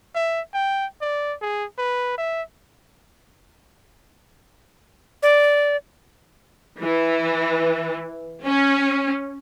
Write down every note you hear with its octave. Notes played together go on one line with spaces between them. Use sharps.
E5
G5
D5
G#4
B4
E5
D5
E3
C#4